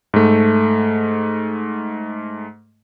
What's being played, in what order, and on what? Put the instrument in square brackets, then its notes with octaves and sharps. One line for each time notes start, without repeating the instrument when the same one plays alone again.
[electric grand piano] G#2 A3